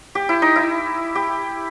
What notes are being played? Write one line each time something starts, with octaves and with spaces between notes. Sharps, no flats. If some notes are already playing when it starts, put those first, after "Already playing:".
G4
E4
D#4
E4
G4